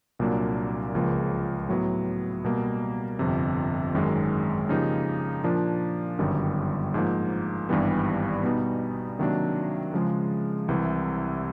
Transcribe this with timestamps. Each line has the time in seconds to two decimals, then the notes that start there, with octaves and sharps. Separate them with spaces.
0.19 C2 A#2 F#3 A#3 D4
0.95 C#2 C#3 F3 A#3
1.68 A2 F#3 B3
2.44 B2 G3 A#3
3.19 G1 F2 C3
3.94 G#1 F#2 D#3 G#3
4.69 C#3 F3 A#3 D#4 G4
5.44 A#2 F3 A#3 D4
6.19 G1 F#2 D#3 G3
6.94 G#2 F3 A#3
7.69 G#1 G2 E3 G3 B3
8.43 B2 G3 B3 D#4
9.19 C3 D#3 F#3 A#3 D4
9.94 C#3 F3 G#3
10.68 C2 C3 E3